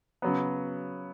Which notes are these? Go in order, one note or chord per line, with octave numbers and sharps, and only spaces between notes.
C#3 F#3 B3